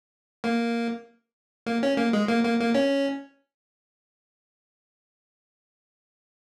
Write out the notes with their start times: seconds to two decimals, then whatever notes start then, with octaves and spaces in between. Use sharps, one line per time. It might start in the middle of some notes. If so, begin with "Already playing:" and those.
0.44 A#3
1.66 A#3
1.83 C#4
1.97 A#3
2.13 G#3
2.28 A#3
2.44 A#3
2.59 A#3
2.74 C#4